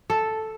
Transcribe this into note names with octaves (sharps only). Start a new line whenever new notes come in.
A4